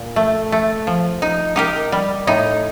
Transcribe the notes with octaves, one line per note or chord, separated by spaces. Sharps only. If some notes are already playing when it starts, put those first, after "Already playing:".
Already playing: A#2
A3
A3
F3
D#4
D#4 G4 A#4
G3
A2 D#4